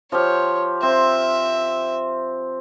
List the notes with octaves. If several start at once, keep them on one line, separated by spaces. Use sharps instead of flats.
F3 G4 C#5 F5
C4 E5